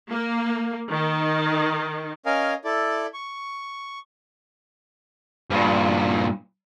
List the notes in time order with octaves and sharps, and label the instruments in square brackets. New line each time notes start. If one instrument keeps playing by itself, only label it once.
[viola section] A#3
D#3
[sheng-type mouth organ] C#4 A#4 D#5 F5 G#5
E4 A4 D5
C#6
[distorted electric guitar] G2 A#2